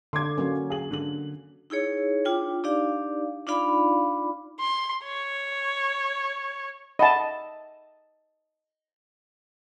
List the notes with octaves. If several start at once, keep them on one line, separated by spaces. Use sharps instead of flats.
D3 C6 D6 G#6
F#3 A#3 C#4
G#4 F#7
D3 F#7
D#4 E4 G#4 C#5
D4 F4 G5
D4 D#4 G4 D5 F5
D4 D#4 F4 D5 F5 B5
C6
C#5
D#5 E5 F#5 A5 B5